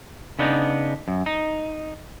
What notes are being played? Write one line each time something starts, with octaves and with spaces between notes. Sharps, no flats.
C#3 B3 D4 D#4
F#2
D#4